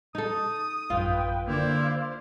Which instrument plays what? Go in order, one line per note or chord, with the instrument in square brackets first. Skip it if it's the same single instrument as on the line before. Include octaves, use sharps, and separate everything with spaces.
[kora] D#4 A4 [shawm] D#6
[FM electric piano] A1 F#2 [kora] F4 [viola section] B4 G5
[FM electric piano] D3 A#3 [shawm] E4 [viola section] C5 D5 F5